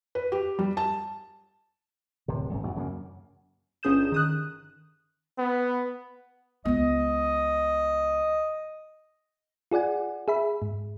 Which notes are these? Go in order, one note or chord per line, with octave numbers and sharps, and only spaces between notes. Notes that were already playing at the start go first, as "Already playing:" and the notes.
B4
G4
G3
A5
D1 C3
G#1 F#2
D2 B2
F#2 C#3 F#3 A#3
G1 C#4 G#4 D#6 G6 E7
D#3 D#6 F#6
B3
C#2 B3 D#5
F4 G#4 D5 F#5 G#5
G#4 E5 B5
G#2